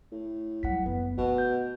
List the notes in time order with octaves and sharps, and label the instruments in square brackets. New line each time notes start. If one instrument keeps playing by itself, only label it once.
[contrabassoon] A2
[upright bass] F#3 G3 [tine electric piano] F#5 B6
[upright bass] F#1 [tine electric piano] B3
[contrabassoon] B2 [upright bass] A3
[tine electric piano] G6